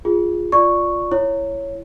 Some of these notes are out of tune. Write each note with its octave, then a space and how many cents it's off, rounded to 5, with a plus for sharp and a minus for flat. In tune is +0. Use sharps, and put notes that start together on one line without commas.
F4 +0 G#4 -10
F4 +0 D5 +0 C#6 +0
E4 +20 C#5 +0